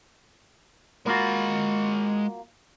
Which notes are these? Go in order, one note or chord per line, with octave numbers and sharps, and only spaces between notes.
G#3 A#3 F4 F#4 B5